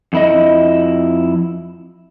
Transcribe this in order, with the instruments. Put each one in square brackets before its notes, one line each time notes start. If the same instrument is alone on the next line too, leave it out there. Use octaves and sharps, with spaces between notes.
[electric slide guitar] F2 E4 D#5